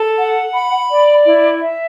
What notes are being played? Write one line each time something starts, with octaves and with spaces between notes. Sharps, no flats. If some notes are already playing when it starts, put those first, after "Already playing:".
Already playing: A4
F#5
B5
D5
E4
E5